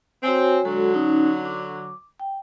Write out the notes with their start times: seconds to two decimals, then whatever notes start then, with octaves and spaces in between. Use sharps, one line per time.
0.23 C4 F#4 C#5 G#5
0.65 D3 F#3 G#3 F#4 A4
0.94 C#4 D#4 C#6
1.45 D6
2.20 G5